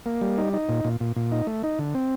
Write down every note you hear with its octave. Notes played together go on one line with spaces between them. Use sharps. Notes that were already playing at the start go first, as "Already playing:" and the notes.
A#3
G3
D#4
D#4
A#2
A#2
A#2
A#2
D#4
A3
D#4
D3
C4